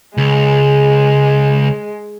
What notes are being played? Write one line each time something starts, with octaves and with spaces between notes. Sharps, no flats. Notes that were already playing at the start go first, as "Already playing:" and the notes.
C#2 G#3